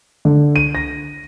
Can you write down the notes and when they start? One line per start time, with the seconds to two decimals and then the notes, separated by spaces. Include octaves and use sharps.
0.25 D3
0.56 D#7
0.75 A#6